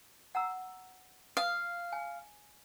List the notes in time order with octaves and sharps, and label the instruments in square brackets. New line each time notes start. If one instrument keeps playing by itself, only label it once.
[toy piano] F#5 A#5 E6
[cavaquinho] F5 [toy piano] D#6
[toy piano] G#5